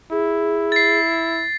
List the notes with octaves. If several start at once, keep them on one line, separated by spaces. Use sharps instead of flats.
E4 G#4
A6 C7